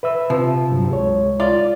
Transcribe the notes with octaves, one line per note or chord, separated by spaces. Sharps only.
B4 E5 E6
C3 F3
G2 F#3
C#2 G#3 C#5
F4 D5